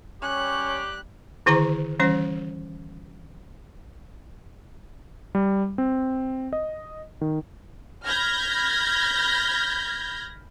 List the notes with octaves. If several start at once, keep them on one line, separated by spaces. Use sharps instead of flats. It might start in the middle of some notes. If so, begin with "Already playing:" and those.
G3 C#4 G4 C#5 F#6
D3 D#3 E4 G#4 C5 A#5
E3 G3 C#4 C5
G3
C4
D#5
D#3
B5 F6 G6 G#6 A#6